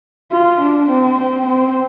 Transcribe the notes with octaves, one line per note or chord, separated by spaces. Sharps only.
F4
D4
C4
C4
C4